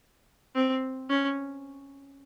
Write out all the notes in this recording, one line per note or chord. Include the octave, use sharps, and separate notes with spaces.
C4
C#4